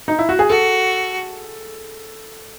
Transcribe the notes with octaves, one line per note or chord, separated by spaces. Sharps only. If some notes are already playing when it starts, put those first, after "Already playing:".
D#4
E4
F#4
G#4
F#4 A4